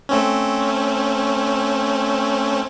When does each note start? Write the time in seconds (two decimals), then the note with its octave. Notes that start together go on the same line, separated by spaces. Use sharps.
0.09 A3 C4 C#4